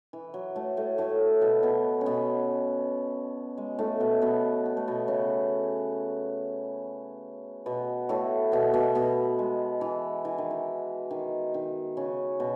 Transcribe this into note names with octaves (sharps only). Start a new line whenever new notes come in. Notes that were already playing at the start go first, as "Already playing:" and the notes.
E3
F#3
A2 A3
A2 A3
A2 A3
B2 B3
B2 B3
C#4
B2 B3
G#3
A2 A3
B2 B3
B2 B3
B3
A3
B2 B3
C#3 C#4
B2 B3
A2 A3
B2 B3
B2 B3
B2 B3
G#3
E3
E3
D#3
E3
D#3
D#3
C#3 C#4
B2